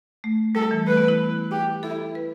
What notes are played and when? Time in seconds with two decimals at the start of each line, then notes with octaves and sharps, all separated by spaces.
0.24 A3
0.55 G3 A4
0.71 E3
0.87 A3 B4
0.97 B3
1.08 E4
1.51 G4
1.83 E4 A4
2.15 B4